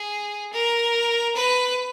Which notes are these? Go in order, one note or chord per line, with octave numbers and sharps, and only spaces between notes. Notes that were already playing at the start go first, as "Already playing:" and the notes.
Already playing: G#4
A#4
B4